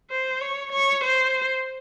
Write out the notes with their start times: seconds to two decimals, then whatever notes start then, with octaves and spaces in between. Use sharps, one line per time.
0.10 C5
0.41 C#5
0.72 C#5
1.04 C5